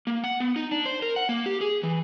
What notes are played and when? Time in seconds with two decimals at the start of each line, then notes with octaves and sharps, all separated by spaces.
0.07 A#3
0.24 F#5
0.40 B3
0.56 D#4
0.71 D4
0.86 C5
1.02 A#4
1.16 F#5
1.29 A#3
1.46 G4
1.61 G#4
1.83 E3